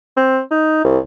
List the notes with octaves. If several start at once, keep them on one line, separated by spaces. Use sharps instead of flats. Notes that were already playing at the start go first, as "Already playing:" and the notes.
C4
D#4
C2